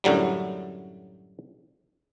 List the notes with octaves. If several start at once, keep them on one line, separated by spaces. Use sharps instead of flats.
F#2 A2 D3 F#3 G3